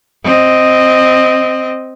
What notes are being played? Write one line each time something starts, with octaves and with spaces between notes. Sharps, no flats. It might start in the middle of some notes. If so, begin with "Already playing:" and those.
C4 D#5